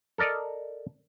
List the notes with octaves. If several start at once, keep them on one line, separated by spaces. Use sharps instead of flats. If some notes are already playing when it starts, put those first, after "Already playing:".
A4 A#4 D5 D#5